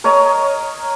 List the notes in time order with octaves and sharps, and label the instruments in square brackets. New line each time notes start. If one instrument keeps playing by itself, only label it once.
[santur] A#4 C#5 D#5 A#5